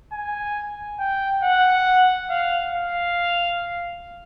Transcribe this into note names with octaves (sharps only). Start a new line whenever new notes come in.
G#5
G5
F#5
F5
F5